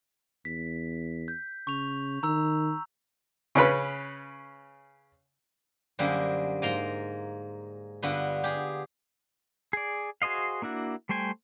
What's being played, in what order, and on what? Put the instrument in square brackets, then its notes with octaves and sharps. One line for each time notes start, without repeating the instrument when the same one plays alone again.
[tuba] E2 [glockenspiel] B6
[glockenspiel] G6
[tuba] C#3 [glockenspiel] C#6 F7
[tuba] D#3 [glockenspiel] A#5 E6
[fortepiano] C#3 C#4 B4 B5
[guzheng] F#2 D3 G3 A#3 G#4 C5
G#2 A#3 A#4 A#5 C6
G2 D3 B3 F4 F#4
G4 G#4
[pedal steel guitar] G#4 D5
F#4 G#4 C5 D#5 F5
A#3 D4 E4 F#4
G3 A3 C5 G5 G#5